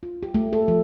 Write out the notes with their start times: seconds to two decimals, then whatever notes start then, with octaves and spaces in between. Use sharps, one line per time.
0.03 F4
0.23 G4
0.34 A3
0.53 A4
0.68 F3